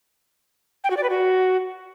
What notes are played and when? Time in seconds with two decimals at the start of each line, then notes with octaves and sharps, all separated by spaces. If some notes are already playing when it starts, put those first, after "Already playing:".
0.84 G5
0.90 F#4
0.97 D5
1.03 B4
1.10 F#4